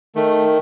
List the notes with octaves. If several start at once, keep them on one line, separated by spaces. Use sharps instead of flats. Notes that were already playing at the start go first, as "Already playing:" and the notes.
D#3 A3